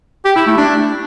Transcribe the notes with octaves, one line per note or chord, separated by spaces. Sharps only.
G4
E4
A3
D4